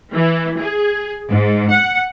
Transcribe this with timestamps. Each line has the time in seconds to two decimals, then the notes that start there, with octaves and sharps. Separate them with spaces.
0.13 E3
0.59 G#4
1.28 G#2
1.70 F#5